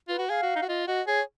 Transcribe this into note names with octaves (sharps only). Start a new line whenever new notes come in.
F4 B4
F#4
G#4 F5
F#4
D#4
F#4
F4 D#5
F#4 D#5
G#4 C#5